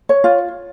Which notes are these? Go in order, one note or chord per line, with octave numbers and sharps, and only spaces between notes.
C#5
F4